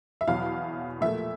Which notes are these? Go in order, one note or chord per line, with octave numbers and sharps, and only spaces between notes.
E5
E2 B2 F#3 F5
A#2 F3 A3 E5